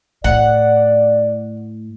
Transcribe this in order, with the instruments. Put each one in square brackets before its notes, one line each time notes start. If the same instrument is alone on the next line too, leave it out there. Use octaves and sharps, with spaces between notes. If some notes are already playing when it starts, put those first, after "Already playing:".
[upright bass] A2 [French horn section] D5 [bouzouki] F#5